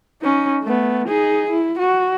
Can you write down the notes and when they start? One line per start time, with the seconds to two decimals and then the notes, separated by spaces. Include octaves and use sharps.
0.22 C#4 D#4
0.63 A3 B3
1.08 D#4 G#4
1.50 E4
1.79 F#4